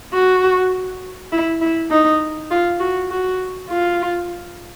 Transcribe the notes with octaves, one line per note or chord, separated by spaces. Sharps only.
F#4
E4
E4
D#4
F4
F#4
F#4
F4